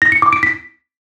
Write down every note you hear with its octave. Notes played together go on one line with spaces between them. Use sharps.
A#6
C#7
D6
D7
B6